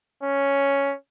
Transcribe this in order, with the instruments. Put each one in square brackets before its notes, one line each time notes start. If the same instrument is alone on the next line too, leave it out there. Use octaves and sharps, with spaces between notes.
[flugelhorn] C#4